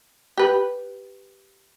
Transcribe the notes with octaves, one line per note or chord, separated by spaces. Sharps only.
G4 B4